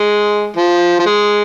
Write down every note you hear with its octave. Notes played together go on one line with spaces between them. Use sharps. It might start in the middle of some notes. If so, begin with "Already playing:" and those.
Already playing: G#3
F3
F3
G#3